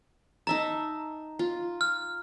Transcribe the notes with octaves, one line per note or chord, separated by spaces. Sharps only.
D#4 E5 A5 A#5
F4
F6